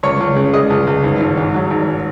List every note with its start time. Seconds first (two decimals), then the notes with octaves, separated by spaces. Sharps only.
0.03 C#2 C#5
0.20 C#2
0.36 C#3
0.53 G#3 D#5
0.70 C#2
0.87 C#2
1.03 G#1
1.20 G#1
1.37 G#2
1.54 F#3
1.70 G#1